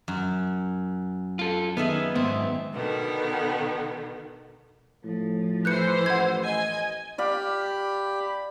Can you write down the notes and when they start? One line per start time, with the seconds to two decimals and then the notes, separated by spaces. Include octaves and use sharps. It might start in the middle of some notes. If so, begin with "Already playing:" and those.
0.08 F#2
1.39 F4 A4
1.77 D#3 B3 G#4 E5
2.15 G#2 B3 C4
2.73 B2 D3 D#3 B3
5.04 A2 F3
5.65 E3 C5 F#6 G6 C#7
6.06 A1 F#5 G#6
6.43 D#5 G#5
7.18 G4 D5 F5 B5